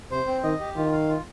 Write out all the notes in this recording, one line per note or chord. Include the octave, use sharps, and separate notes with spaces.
C3 C5
C4
D#3 D#5
G4
D#3 F4
F5
F4